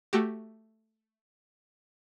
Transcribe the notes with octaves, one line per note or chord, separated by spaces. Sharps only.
A3 F#4 G4